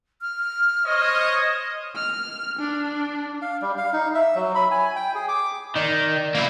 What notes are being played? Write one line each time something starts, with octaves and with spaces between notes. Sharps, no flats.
F6
C5 C#5 D#5
F6
D4
F5
G3
F5
D#4
E5
F#3
B5
G#5
G5
G#4
D6
D#3 D5
A#3 E4